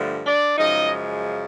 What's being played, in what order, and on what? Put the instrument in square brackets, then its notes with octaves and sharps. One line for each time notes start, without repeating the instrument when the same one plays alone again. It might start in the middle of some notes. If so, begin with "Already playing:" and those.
Already playing: [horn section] G2 D3 F3 A3
D4 D5
F#2 C#3 F3 G#3 D#4 D#5